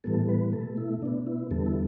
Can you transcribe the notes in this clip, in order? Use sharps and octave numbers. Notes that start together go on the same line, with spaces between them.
A2 E3 G3 B3 A4
B4
B2 A3 A4
E4
B2 B3 D4
E4
E2 D3 G3 B3 A4
E4